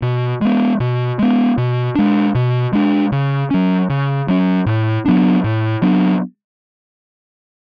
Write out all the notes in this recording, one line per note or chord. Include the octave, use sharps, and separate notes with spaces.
B2
G#3 B3
B2
G#3 B3
B2
G#3 D4
B2
G#3 D4
C#3
F#3 C#4
C#3
F#3 C#4
A2
F#3 B3 D4
A2
F#3 B3 D4